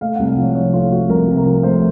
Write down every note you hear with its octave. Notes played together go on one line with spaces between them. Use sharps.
A3 F5
C2 F#5
F5
F3
C#5
C3 C#5
A3 F4
F3 F#4
C2 A#4
C3
A#4
F3
A3 C5